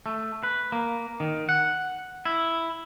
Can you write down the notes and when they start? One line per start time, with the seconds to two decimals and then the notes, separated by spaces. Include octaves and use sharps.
0.06 A3
0.43 B4
0.72 A#3
1.20 D#3
1.49 F#5
2.25 E4